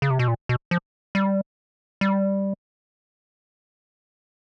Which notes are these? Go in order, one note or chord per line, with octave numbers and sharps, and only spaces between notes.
C#3
C3
B2
A#2
B2
F3
G3
G3